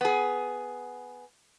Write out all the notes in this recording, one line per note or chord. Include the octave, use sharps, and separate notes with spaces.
B3 G#4